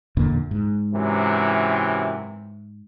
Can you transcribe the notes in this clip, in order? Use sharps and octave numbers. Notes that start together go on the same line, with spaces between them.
E2 A#2 D3
G#2
F#2 C3 E3